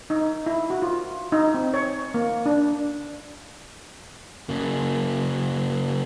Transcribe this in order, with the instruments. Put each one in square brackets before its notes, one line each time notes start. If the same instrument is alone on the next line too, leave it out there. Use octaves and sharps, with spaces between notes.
[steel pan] D#4
E4
F#4
F4
D#4
C4
C#5
A#3
D4
[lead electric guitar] C#3 A#3